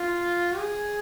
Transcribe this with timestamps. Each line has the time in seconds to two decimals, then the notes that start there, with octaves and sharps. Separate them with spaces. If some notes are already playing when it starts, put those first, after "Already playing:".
Already playing: F4
0.58 G#4